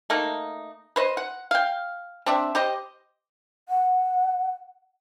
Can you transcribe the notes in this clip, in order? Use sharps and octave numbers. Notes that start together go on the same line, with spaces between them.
A3 A#3 D#4
B4 C5 D#5
F#5
F5 G5
C4 D4 E5
G4 C5 D#5
F#5